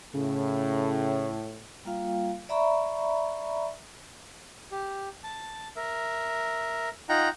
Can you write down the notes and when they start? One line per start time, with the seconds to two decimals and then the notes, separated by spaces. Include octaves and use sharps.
0.14 A2 C#3
1.85 G3 A#3 F4 F5 G5
2.49 D5 E5 A#5 B5 C#6
4.72 G4
5.23 A5
5.76 A#4 E5
7.09 D#4 F4 F#5 G5 A#5